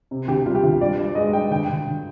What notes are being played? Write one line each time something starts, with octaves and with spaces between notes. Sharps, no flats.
C3
D2 G4
G3 F4
G4
D2 F4
G2 D5
G2
G#3 D#5
G2 G5
D3 G5
D3
D3